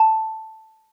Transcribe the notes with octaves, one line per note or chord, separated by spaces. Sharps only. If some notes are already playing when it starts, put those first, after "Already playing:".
Already playing: A5